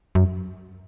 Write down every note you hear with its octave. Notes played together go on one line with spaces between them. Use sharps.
F#2